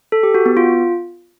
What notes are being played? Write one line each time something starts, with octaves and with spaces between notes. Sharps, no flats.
A4
G4
F#4
B3
F4